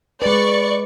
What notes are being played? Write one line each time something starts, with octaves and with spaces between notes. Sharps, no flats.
G#3 B4 D5 C#6